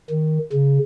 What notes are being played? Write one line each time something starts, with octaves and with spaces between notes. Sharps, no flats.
D#3
C#3